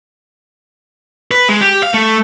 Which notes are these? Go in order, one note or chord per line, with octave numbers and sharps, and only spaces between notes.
B4
G#3
G4
F5
A3